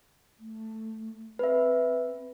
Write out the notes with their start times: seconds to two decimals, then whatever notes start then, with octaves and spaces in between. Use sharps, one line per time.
0.39 A3
1.39 C4 B4 E5